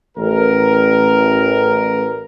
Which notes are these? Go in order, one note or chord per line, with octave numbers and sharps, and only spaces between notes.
A1 A#4